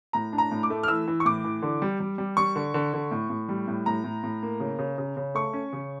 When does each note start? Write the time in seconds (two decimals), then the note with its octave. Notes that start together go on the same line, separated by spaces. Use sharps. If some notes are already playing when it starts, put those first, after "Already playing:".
0.13 A2 A#5
0.32 D4
0.38 A#5
0.51 A2
0.63 D6
0.70 A3
0.83 F6
0.88 E3 E6
1.08 E3
1.20 C#6
1.25 A2 D6
1.44 E3
1.62 D3
1.82 G3
2.00 G3
2.18 G3
2.37 G3 C#6
2.56 D3
2.74 D3
2.94 D3
3.11 A2
3.30 A2
3.49 G3
3.68 A2
3.86 A2 A#5
4.04 A2
4.23 A2
4.43 A#3
4.60 C#3
4.79 C#3
4.98 C#3
5.17 C#3
5.35 A3 C#6
5.53 C#4
5.73 C#3